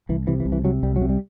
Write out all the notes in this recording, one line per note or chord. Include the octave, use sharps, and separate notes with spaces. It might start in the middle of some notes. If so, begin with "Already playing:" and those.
C2 E3
C3 E3
E3
C2
E3
C3 F#3
C2 G3
F#3
C3
G3